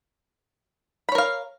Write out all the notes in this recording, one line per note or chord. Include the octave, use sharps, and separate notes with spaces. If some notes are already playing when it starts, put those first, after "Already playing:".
A#4 C#5 F5 B5